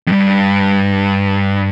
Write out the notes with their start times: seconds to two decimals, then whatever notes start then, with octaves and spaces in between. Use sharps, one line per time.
0.07 F2
0.12 G2